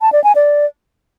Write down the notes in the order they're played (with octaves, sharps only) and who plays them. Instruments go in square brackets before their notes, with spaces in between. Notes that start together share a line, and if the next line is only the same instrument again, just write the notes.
[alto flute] A5
D5
G#5
D5